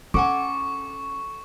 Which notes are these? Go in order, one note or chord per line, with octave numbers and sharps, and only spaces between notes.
C#4 A4 F#5 G#5 C#6 D6